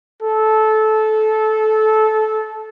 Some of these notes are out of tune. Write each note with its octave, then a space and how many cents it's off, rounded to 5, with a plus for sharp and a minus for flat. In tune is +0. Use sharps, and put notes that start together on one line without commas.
A4 -20